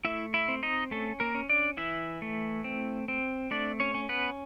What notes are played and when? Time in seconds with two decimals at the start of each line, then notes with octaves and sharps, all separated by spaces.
0.05 A3 E4 E5
0.34 E4 E5
0.48 C4
0.63 D#4 D#5
0.91 A3 C#4 A4
1.20 A#3 A#4
1.35 C#4
1.49 D4 D5
1.77 E3 E4 E5
2.22 A3
2.64 C4
3.08 C4
3.51 A3 D4 D5
3.80 C#4 C#5
3.94 C#4
4.09 B3 B4